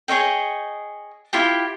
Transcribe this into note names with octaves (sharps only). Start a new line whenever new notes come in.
G#4 C#5 D#5 G5
E4 F4 G4 G5